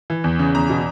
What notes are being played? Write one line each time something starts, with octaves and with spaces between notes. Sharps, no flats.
E3
E2
C#3
E2 A#5
B2